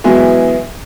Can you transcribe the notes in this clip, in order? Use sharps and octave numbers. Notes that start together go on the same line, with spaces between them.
B2 E3 F#3 G#3 B3 E4